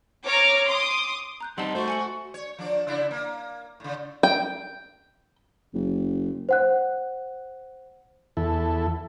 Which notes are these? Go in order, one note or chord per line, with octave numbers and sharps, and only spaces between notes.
C#5 A#5 D6 F6
C6 D6 D#6
A#5 F#6 G6
G3 C4 D#4 F#5 A5
A3 F#4 C5
G#5 C#7 F#7
C#5
F3 D4 D5
C#3 D4 E4
A#3
A2 C#3
G5
F#1
C5 F#5 F#6
E2 E4 A4